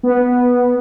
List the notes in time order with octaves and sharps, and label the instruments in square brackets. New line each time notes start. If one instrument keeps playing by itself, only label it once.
[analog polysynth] B3